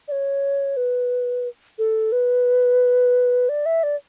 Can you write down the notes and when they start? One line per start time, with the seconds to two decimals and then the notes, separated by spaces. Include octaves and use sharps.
0.08 D5
0.12 C#5
0.77 B4
1.79 A4
2.12 B4
3.49 D5
3.66 E5
3.83 D5